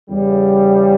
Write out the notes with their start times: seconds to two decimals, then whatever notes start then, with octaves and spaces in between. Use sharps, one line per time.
0.10 E2 C#3 G3